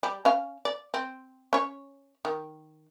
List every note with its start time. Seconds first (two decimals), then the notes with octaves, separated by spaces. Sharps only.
0.03 G3
0.25 C#4 F5
0.65 D5
0.94 C4
1.53 C#4 C#5
2.25 D#3